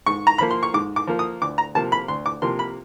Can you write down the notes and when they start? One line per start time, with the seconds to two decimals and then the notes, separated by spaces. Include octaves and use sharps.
0.06 G#2 C#6
0.27 A#5
0.38 F3 A#3 B5
0.51 C6
0.63 C#6
0.73 G#2 D6
0.96 D6
1.07 F3 A#3
1.19 D#6
1.41 D2 D6
1.58 A#5
1.75 C3 F3 A#3 A5
1.92 B5
2.08 D2 C6
2.26 D6
2.42 C3 F3 A#3 C6
2.59 B5